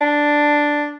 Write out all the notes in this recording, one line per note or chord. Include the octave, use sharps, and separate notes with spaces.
D4